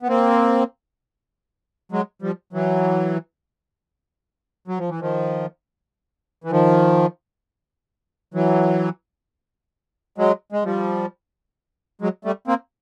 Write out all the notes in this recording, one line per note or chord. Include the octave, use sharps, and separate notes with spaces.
B3
A#3 C4
F#3 G#3
F3 G3
E3 F#3
F#3
F3
E3
D#3 F3
E3
D#3 F3
E3 F#3
F#3 G#3
G#3
F3 G3
F#3 G#3
G3 A3
A#3 C4